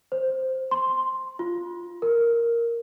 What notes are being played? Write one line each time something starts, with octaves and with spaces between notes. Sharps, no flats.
C5
C6
F4
A#4